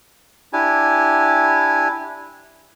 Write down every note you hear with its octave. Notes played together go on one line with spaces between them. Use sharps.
D4 E4 G4 G#5